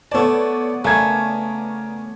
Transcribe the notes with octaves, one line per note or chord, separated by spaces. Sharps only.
A3 B3 C#5 D5 A5
C#3 A3 A#4 G#6